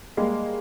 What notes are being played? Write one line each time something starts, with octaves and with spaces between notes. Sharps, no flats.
G3 G#3 A#3